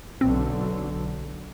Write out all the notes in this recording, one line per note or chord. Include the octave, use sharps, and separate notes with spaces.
B1 D3 C4